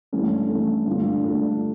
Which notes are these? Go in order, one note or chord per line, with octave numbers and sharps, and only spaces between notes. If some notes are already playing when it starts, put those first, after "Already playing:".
G2 E3 A3 C#4
G2 E3 A3 C#4
G2 D3 A3 D4 F4
G2 D3 A3 D4 F4